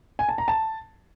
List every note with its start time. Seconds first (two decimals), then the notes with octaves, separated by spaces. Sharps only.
0.19 G#5
0.29 A5
0.38 A#5
0.48 A5